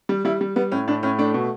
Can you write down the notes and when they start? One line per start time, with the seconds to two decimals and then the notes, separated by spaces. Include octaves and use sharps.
0.09 G3
0.25 G3 E4
0.41 G3
0.56 G3 B3
0.72 A2 C#4
0.88 A2 D4
1.03 A2 C#4
1.18 A3 D4
1.34 B2